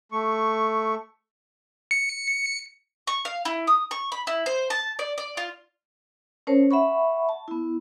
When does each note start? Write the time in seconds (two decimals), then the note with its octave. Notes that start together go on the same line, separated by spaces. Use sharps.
0.12 A3 C#6
1.91 C#7
3.07 C#6
3.25 F5
3.45 E4
3.67 D#6
3.91 C#6
4.12 B5
4.27 E4
4.46 C5
4.70 A5
4.99 D5
5.18 D5
5.37 F4
6.47 C#4 A#4 C5 C#5 A5
6.71 E5 F#5 B5 C#6
7.29 A5
7.48 B3 E4